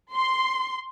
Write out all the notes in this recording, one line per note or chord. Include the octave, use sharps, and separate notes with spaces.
C6